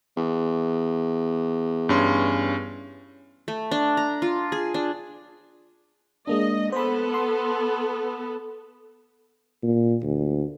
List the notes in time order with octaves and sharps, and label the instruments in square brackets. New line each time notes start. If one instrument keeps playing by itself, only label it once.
[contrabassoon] E2
[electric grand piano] G2 C#4 C6
[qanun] A3
D4
A#5
F4
G#4
D4
[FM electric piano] G#3 A#3 D4 [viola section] D#5
[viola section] B3 A4 [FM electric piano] C5 B5
[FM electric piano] C6
[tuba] A#2
D2